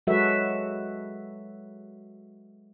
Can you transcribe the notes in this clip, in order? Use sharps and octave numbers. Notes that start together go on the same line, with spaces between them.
F#3 G#3 F#4 A4 B4 E5